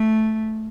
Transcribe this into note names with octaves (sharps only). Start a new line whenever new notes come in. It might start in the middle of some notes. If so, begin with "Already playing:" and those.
Already playing: A3